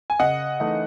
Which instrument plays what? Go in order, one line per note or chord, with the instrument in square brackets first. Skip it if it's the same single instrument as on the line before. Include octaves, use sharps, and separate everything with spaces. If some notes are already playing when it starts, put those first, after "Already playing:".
[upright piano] G#5
C#3 D#5 F#5
E3 A3 D#4